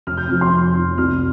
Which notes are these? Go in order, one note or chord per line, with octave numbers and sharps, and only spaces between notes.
F1 F6
G6
F2 F3 F6
C6
F1
F2 F3
C2 F6